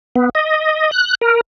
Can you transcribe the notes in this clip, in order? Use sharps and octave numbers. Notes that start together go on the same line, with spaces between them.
B3
D#5
F#6
A#4